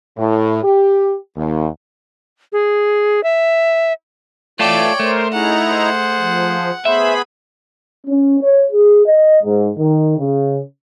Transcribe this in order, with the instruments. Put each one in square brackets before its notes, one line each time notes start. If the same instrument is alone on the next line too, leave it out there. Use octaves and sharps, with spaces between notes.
[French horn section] A2
G4
D#2
[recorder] G#4
E5
[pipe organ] E3 [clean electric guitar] A3 F4 A4 [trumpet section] C#5 [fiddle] D5 G5
[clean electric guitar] A3 [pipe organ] A#4 C5
[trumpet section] C#4 G#4 [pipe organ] D#4 E4 A#5 [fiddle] F#5
[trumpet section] G#4 C5
[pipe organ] F3
[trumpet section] A3 C5 [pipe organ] B3 G#4 B5 [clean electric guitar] E5
[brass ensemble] C#4
C#5
G#4
D#5
G#2
D#3
C#3